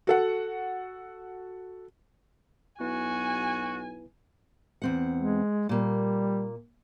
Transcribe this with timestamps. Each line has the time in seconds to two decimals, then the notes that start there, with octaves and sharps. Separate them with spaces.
0.07 F#4 A4 F#5
2.80 B1 B3 E4 F#4 B4 G#5
4.82 E2 C4 F#5
5.17 G#3
5.69 A#2 G3 A#3